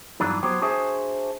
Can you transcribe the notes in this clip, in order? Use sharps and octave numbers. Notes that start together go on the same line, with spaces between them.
E2 G2 E3 F#3 D4 D#4
F#3 B3 F#4 G4 C5 C#5
D4 F#4 G#4 C5 E5 G#5